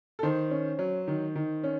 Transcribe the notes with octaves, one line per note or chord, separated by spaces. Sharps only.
A4
D#3 C5
C#4
F#3
D#3
D#3
C#4